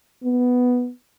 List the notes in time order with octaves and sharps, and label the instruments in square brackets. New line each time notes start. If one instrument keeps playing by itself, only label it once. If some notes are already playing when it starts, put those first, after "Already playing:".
[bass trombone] B3